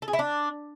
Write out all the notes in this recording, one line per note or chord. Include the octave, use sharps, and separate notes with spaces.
A4
G#4
E4
D4